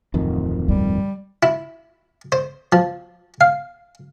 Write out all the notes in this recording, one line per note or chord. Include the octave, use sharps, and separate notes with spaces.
D1 F2 D#3
G2 D3 G3
E4
C5
F3
F5